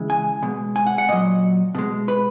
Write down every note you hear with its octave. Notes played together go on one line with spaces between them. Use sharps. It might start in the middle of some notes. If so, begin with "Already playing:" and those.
Already playing: C#3 E3 G#3
G#5
B2 G#3
G#5
F#5
F#5
A#2 F#3 D#5
B2 G#3
B4